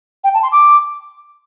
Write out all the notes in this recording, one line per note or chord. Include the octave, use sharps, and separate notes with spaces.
G5
A5
C6
D6